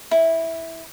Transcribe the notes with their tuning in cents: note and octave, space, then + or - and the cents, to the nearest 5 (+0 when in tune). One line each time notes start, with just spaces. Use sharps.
E4 -10